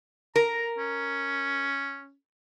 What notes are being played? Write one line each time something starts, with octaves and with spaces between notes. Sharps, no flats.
A#4 A#5
C#4